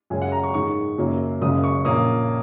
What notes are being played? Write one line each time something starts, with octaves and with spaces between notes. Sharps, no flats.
F#2 C#3 G#3 C#4 G#5
F#5
A#5
C#6
G#2 D#3 G#3 C#6
F#1 F#2 F#3 A#3
F#1 F#2 C#3 G#3 D#6
C#6
A#1 A#2 A#3 C#4 D#6